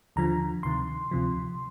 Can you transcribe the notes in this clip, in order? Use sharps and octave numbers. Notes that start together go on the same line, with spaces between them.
D#2 D3 F3 A#5
D2 C3 D#3 C6
D2 C3 F3